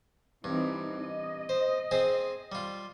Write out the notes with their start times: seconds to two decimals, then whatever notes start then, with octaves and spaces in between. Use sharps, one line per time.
0.44 G2 E3 C4 D#4
1.00 D#5
1.49 C5
1.91 C4 G#4 C5
2.52 G3 F4